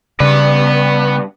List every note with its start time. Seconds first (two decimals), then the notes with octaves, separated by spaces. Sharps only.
0.20 G2 C#3 B3 B4 D5